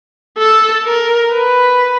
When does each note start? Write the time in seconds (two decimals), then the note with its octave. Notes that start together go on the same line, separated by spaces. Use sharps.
0.38 A4
0.85 A#4
1.34 B4